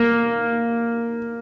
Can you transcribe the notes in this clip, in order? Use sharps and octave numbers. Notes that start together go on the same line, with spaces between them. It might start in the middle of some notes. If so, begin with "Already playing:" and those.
Already playing: A#3